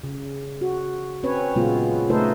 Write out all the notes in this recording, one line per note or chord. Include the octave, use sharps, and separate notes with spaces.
C#3
F#4
C4 C#4 B4 C#5
A#2 C#3 F#3 G#3 B3 F4
C#3 A3 D#4 A4 B4 C5